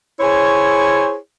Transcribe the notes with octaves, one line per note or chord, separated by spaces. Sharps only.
E4 G#4 C5 C#5